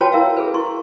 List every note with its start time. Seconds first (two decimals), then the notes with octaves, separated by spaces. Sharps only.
0.01 F4 F#4 B4 C#5 G5 A5
0.12 E4 A#4 E5 F5
0.37 G#4 A4 B4
0.54 E4 C6 C#6